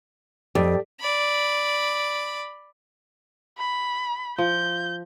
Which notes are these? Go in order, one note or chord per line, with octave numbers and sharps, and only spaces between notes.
F2 G4 A4 D5
D5 B5
B5
F3 G6